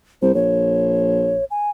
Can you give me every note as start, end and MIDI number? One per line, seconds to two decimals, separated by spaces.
0.22 0.31 36
0.22 0.34 72
0.35 1.41 34
0.35 1.45 73
1.51 1.70 80